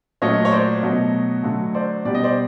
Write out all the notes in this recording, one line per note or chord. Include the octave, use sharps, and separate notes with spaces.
A#2 F#3 A3 C#5 D#5
C#5
C5 D5
B2 F#3 A3 C#5 D#5
D3 F#3 A3
C5 D5
B2 G3 D5
D#5
C5 D5